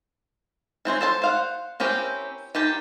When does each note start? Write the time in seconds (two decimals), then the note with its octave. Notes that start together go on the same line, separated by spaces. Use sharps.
0.85 E3 C4 C5 C#5
1.01 A4 C5 A5
1.22 C5 F5 F#5
1.80 C4 C#4 E4 G4 A#4
2.55 D#3 D#4 G4 A5